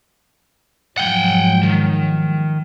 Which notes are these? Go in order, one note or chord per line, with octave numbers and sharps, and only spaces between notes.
G#2 F3 F#3 F#5 G5
D#3